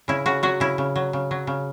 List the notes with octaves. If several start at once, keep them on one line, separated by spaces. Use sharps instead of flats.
C#3 E4
C#3 F#4
F#3 F#4
C#3 E4
C#3
F#3
C#3
F#3
C#3